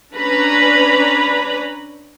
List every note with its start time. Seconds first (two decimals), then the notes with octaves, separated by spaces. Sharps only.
0.14 C#4 D4 B4 A#5 B5